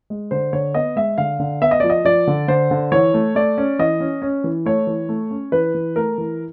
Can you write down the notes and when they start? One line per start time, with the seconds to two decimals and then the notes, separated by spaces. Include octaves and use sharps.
0.10 G#3
0.31 D3 C5
0.53 D3 C#5
0.75 B3 D#5
0.96 G#3 E5
1.18 D3 F5
1.40 D3
1.62 B3 E5
1.71 D#5
1.80 F3 D5
1.90 D#5
2.04 F3 D5
2.27 D3
2.48 D3 C5
2.71 D3
2.92 E3 C#5
3.14 A3
3.35 A3 D5
3.58 C#4
3.79 E3 D#5
4.00 C#4
4.22 C#4
4.44 E3
4.66 A3 C#5
4.87 E3
5.09 A3
5.31 C#4
5.52 E3 B4
5.74 E3
5.96 A3 A#4
6.18 E3